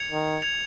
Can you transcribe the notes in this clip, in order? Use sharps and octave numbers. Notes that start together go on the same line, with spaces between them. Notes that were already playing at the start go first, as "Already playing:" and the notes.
Already playing: G#6 C#7 F7
D#3
G#6 C#7 F7